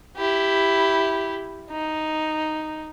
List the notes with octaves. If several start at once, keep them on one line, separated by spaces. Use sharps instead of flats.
E4 G4
D#4